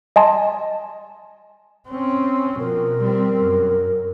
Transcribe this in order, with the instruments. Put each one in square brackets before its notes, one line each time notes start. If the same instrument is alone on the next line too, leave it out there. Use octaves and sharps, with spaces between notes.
[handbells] D#5 G#5 A5 C6
[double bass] C4 C#4
[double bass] B2 F3 [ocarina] A#4
[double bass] G3 C4
F#2